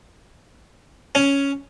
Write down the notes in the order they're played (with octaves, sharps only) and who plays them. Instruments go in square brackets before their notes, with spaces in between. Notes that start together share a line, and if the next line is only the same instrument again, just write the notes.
[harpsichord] C#4